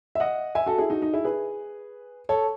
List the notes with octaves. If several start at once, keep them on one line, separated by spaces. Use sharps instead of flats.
E5
D#5 F#5
E5 G#5
F#4 A4
E4 G#4
D#4 F#4
D#4
E4 G#4
G#4 B4
A4 C#5